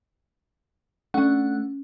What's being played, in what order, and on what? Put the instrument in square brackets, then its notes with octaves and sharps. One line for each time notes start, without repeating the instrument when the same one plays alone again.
[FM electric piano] A3 D4 F#5 [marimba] C#4